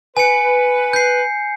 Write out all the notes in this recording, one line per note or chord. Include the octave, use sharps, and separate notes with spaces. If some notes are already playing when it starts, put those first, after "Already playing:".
B4 G#5 C#7
G6 C7